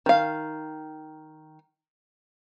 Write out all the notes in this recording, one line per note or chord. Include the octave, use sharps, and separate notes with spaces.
D#3 F5